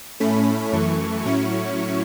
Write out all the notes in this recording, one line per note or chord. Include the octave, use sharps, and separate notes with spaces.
A2 A3 C#4 B5
F#2 E3 A3 C#6
A2 F#3 C#4 E4